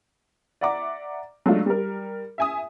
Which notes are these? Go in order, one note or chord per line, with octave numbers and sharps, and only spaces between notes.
D5 E5 F#5 A#5 D6
F#3 G#3 A3 D4 F4
G3 A#4
E5 G#5 D#6